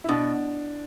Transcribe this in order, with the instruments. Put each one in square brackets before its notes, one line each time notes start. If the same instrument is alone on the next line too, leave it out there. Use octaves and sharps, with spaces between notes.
[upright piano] E4
[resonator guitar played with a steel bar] B2 [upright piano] D4